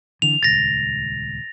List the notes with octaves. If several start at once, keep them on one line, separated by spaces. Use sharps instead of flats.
D3 E3 F7
D#1 C#2 A6 A#6